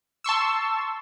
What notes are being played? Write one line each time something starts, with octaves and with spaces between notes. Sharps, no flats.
A5 C6 C#6 E6